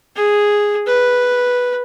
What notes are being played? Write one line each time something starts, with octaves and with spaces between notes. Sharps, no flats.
G#4
B4